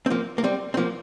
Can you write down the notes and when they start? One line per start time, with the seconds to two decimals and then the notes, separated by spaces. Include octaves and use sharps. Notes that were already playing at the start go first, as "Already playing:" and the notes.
0.06 C4
0.10 F3 A#3
0.38 A#3
0.44 G3 C4
0.74 C4
0.77 F3 A#3